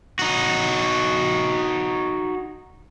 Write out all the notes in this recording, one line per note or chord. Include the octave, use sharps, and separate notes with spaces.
D#4 F#4